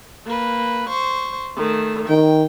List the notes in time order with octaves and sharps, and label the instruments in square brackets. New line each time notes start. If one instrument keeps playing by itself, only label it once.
[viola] A#3 B4
C5 C#6
D#3 A3
[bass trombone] D#3 [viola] G5